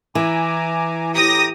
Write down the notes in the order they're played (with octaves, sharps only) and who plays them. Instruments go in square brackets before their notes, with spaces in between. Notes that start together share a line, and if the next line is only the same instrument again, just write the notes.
[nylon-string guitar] E3 [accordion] G#5 A#5 D6
[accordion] A2 A#5 D6 [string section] G4 D#6 A#6